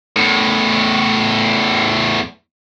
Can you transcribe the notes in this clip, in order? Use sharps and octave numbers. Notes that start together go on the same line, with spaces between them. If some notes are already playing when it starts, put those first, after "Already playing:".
E2 A2